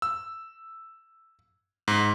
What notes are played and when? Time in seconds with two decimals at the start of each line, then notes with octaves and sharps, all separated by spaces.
0.02 E6
1.88 G#2